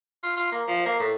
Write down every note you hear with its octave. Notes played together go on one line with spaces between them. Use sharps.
F4
F4
A#3
F3
A#3
A2